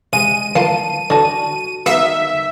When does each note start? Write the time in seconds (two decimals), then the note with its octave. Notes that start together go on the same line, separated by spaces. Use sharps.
0.13 C3 G#3 D#7
0.55 E3 A#3 F4 A5
1.10 D3 F#4 A5
1.86 D#3 B3 F#4 E5 F5